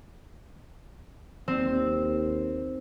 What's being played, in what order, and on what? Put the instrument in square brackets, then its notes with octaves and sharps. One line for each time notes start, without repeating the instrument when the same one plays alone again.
[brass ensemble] D#2 [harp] C4